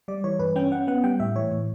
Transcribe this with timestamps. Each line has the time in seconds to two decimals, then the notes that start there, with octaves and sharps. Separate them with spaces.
0.08 G3 D5
0.24 E3 C#5
0.39 G2 B4
0.56 C#4 G5
0.72 C#4 F#5
0.87 B3 F#5
1.03 G3 G5
1.20 A2 E5
1.36 E3 C#5
1.52 A2